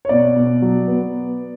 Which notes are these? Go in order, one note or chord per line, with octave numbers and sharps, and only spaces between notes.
C#5
B2 D5
B2
F#3
B3